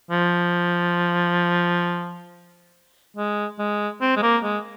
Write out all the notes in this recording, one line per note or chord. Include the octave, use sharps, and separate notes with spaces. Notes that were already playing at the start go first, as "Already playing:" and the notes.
F3
G#3
G#3
C4
G#3
A#3
G#3